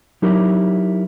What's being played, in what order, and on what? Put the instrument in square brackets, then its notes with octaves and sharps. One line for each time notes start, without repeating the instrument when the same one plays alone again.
[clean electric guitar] F#3 D#4 E4 G4 A#4